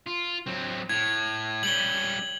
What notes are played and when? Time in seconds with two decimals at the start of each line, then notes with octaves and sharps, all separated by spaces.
0.07 F4
0.46 F#3 C4
0.89 A2 G#6
1.63 G3 C#4 F#7 G7